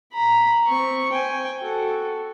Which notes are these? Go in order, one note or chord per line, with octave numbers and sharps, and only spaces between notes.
A#5 B5
C4 C#6
G5 G#5
F#4 A4